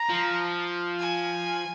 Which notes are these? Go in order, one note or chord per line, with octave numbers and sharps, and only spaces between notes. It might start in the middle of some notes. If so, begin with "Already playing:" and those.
Already playing: A#5
F3
G#5